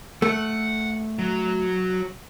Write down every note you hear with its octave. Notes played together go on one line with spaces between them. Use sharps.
A3 F#5
F#3